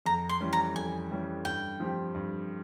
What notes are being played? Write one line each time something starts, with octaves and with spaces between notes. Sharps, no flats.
F2 A#5
C6
E3 G3 C#4
A#5
F2 G#5
E3 G3 C#4
G2 G5
F3 C4 G4
G2